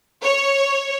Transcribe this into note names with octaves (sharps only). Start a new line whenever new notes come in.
C#5